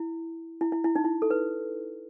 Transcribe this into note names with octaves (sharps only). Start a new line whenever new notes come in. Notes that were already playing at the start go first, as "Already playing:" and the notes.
Already playing: E4
E4
E4
E4
D#4
E4
A4
B4